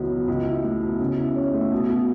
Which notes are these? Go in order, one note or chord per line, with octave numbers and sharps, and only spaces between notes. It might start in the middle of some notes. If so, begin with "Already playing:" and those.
Already playing: C#2 E3 F#3 B3
B2
C#2
E4
A3
B2
C#3
E4
C#4
A3
B2
B2